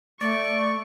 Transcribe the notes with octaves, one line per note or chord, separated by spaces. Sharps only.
A3 D5 C#6